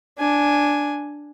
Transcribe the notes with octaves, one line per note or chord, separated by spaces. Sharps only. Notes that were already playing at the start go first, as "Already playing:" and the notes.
D4 G#5